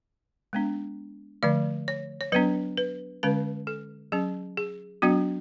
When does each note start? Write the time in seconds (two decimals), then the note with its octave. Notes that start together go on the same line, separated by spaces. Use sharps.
0.53 G#3 B3 D4
1.43 D3 F3 A3 D5
1.88 C#5
2.21 C#5
2.32 F#3 B3 D4 B4
2.77 B4
3.23 D3 G#3 C#4 B4
3.67 A4
4.12 F#3 C#4 G#4
4.57 G#4
5.02 F#3 B3 D4 F#4